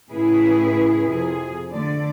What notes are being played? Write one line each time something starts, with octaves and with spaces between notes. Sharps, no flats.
A2 C#3 E4 G#4 B4
F2 C3 G#4
D3 A3 D5